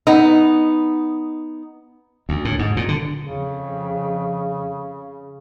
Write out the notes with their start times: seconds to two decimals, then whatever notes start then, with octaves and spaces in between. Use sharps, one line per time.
0.07 B3 D#4
2.29 D2
2.45 A2
2.59 G#2
2.77 A#2
2.88 D3
3.24 F2 C#3